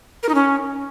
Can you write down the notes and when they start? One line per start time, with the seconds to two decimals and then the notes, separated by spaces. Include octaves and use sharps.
0.23 A#4
0.29 D#4
0.35 C#4